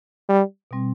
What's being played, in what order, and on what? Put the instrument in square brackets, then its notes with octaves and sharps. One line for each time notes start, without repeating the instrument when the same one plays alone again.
[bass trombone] G3
[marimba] B2 G3 C4